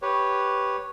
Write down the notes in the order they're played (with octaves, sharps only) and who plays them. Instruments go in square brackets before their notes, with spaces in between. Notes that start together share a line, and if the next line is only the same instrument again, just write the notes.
[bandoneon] G4 B4 C#5